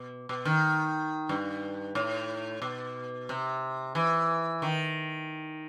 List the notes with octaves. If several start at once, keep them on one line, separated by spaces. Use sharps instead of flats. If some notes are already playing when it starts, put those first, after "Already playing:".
Already playing: B2
B2
D#3
G2
A2
B2
C3
E3
D#3